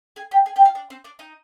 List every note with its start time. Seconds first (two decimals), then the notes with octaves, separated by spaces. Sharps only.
0.16 G#4 G#5
0.31 G4 G5
0.46 G#4 G#5
0.56 G4 G5
0.65 F4 F5
0.75 D4 D5
0.90 C4 C5
1.04 D4 D5
1.19 D#4 D#5